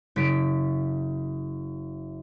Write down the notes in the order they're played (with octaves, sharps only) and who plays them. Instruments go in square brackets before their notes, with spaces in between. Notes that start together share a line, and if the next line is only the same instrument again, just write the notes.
[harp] F#1 B6 D7